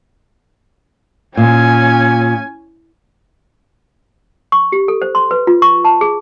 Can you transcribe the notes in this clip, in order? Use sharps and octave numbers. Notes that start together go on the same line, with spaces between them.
A#2 C#4 G#5
C#6
G4
A4
C5
C6
B4
F4
C#6
A5
G#4